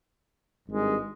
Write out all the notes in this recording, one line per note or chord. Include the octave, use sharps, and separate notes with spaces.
G#1 G2 D#3 G#3